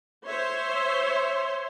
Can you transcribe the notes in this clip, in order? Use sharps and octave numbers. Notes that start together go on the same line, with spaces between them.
C5 C#5 E5 C6